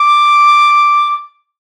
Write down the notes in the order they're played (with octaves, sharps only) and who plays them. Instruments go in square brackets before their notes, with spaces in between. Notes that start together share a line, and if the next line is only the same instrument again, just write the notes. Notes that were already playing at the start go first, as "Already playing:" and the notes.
Already playing: [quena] D6